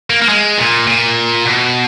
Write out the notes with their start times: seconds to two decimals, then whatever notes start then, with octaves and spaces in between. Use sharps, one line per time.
0.10 A#3
0.22 A#3
0.29 G#3
0.58 A#2
0.87 A#2
1.45 B2